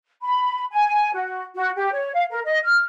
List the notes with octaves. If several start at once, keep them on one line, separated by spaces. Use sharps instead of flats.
B5
G#5
F#4
F#4
G4
C#5
F5
A#4
D#5
F6